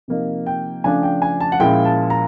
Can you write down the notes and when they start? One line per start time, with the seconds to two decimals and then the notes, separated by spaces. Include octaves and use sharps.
0.08 C3 F3 A#3 D#4
0.46 G5
0.84 C#3 F3 A3 D4 G#5
1.03 G5
1.22 G#5
1.41 A5
1.52 F#5
1.60 A#2 F3 G#3 C#4 E4 G5
1.85 A5
2.10 A#5